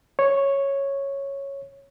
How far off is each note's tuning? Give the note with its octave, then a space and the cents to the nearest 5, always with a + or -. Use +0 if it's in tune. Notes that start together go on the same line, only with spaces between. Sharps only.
C#5 -5